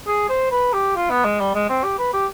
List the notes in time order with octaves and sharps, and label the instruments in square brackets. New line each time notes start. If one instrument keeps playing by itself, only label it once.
[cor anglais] G#4
C5
B4
G4
F4
B3
G#3
G3
G#3
C4
G4
B4
G4